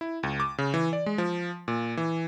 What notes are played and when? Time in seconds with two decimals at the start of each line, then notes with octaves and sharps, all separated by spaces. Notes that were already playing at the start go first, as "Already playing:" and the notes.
0.01 E4
0.23 C#2
0.40 D6
0.58 C#3
0.74 E3
0.93 D5
1.06 G#3
1.18 F3
1.68 A#2
1.97 E3